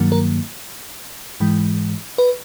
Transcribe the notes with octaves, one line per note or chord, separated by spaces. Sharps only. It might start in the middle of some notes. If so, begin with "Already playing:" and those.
Already playing: G2 D#3 F#3 A#3
A#4
G#2 E3 G#3
B4